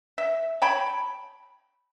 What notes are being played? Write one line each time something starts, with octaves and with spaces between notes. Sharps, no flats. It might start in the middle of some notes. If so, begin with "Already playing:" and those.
E5
C#5 G5 A5 B5